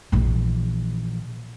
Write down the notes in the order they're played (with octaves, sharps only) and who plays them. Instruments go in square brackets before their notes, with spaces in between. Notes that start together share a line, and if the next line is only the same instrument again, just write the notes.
[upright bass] A#1 E3